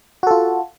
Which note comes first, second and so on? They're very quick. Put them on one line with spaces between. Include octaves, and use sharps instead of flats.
F#4 A4 F4